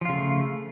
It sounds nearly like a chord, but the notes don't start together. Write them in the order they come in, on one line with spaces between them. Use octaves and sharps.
F3 F4 C#3 A3